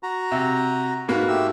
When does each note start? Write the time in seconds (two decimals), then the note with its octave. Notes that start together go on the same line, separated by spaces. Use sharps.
0.03 F#4 A#5
0.32 C3
1.08 G#2 A#3 F#4 B4
1.28 A3 G4 E6